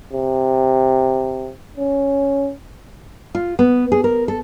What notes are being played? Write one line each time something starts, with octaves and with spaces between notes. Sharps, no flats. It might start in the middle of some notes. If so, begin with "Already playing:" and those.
C3
C#4
F4
B3
G#4
A#4
A4